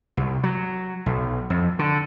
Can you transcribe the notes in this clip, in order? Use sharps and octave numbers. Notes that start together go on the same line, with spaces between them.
C2
F#3
B1
F2
D3